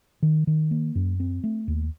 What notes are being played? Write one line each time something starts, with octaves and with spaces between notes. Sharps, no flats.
D#3
D#3
A#3
F#2
C4
A3
D#2